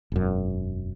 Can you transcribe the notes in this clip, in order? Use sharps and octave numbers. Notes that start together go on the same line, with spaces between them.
E1 F#2